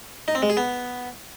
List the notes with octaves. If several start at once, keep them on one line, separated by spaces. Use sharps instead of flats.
D#4
C4
G#3
G#4
B3